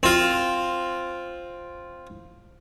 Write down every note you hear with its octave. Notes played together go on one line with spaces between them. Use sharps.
C4 F4